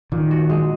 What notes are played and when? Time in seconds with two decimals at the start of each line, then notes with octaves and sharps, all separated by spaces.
0.12 A#2 D#3
0.31 F#4
0.50 G#3